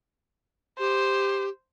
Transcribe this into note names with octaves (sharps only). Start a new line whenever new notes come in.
G4 C5